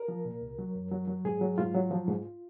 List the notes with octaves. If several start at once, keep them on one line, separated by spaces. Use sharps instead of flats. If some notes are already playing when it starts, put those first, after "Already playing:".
Already playing: A#4
F3
A#2
C2
F#3
F#2
F#3
F#3
G#2 G#4
F#3
G#2 F4
F#3
F3
G#2